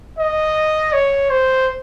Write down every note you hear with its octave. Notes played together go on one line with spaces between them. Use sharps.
D#5
C#5
C5